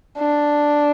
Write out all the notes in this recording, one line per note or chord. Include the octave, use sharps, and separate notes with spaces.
D4